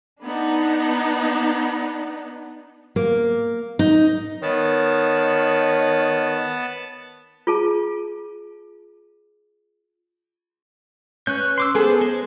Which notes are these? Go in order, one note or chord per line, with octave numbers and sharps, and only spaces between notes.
B3 D4 D#4
A#3
D#4
D#3 B3 C#5 A5
F4 G#4 A5
C#4 B4 F#6 G6
C6 D6 E6
B3 G#4 A4 C5
G#3 C5